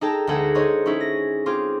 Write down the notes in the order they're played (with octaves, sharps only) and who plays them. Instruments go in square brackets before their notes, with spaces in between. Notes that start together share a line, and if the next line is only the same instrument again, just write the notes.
[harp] D#4 G#4 A4 G5 A5 A#5
D2 G#3 G#4 A4 F#5 A#6
D#4 C5 C#5 D#5
C#4 D#4 E4 G#4
A#6
C4 F4 G#4 D6